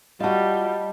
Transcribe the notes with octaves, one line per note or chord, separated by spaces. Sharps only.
G3 F4 F#4 D#5 A5